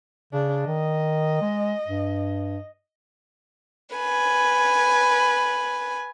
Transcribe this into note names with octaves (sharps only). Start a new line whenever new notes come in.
C#3 D4
D#3 D#5
G#3
G2
B4 G#5